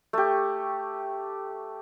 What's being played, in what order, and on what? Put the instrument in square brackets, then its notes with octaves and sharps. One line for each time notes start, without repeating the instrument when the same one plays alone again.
[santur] A3 G4